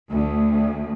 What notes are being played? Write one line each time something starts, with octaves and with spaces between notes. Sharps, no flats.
D2